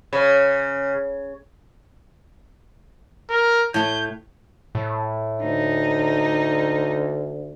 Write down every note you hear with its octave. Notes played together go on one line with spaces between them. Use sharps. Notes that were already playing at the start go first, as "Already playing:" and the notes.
C#3
A#4
A2 A3 G6
A2
D2 D#4